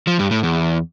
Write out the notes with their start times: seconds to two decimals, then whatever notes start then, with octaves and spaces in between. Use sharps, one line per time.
0.07 F3
0.19 G2
0.31 A2
0.43 E2